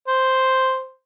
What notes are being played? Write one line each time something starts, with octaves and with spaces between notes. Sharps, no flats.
C5